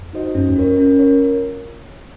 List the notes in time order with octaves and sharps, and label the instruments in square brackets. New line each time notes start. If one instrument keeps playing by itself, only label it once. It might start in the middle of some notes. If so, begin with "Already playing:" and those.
Already playing: [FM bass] F2
[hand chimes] D#4 F#4 C5 D#5
[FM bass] F#2 [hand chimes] C#4
[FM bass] F2
[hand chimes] F4 A#4 C#5
C#4
F4 A#4 C#5